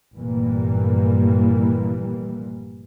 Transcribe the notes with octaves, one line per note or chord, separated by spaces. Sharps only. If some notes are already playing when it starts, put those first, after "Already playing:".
F1 G2 A#2 E3 G3 A#3